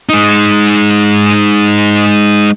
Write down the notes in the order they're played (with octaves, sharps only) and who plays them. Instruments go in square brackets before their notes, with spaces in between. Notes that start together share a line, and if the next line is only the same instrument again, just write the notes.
[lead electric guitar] G#3 D#4